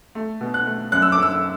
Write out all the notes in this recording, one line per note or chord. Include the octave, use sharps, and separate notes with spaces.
A3
B2
F#6
A3
F#2 F#6
E6
D6
F#2 E6